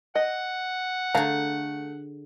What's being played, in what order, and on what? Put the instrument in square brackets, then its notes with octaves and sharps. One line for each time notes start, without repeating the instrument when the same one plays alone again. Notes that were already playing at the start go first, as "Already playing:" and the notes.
[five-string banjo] D#5 [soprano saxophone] F#5
[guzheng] D3 G#4 [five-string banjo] A3 F5 A#5